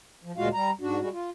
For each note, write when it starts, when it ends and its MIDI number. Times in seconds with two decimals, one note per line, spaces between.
0.24 0.32 53
0.38 0.49 38
0.38 0.49 46
0.38 0.49 56
0.38 0.49 65
0.38 0.49 66
0.38 0.49 77
0.54 0.71 55
0.54 0.71 82
0.81 1.00 44
0.81 1.00 62
0.81 1.00 66
1.00 1.09 55
1.00 1.09 56
1.00 1.09 66
1.13 1.30 65